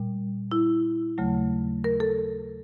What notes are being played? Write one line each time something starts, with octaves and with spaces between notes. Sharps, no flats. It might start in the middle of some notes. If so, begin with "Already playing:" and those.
Already playing: A#2 G3
E4
D#2 C#3 F#3 A3
A#4
A4